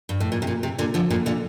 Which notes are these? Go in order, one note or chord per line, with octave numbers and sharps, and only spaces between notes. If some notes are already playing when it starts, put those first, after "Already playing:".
G2
A2
A#2
C3
A#2
C3
A#2 D3
D3 F3
A#2 D3
A#2 D3